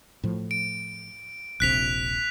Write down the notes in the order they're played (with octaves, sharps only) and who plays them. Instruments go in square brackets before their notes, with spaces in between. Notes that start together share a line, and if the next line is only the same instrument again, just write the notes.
[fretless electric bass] A2 F3
[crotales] D7
[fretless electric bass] D#1 A#1 C3 [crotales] F#6 B6 F7